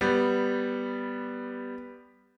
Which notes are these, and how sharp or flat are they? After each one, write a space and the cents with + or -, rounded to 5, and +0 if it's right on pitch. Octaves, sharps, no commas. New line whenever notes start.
G3 +0 B3 +0